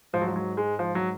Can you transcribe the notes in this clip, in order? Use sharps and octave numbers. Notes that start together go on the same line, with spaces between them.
G#2 F3
F#3
F3
F#3
G#3
F3
F#3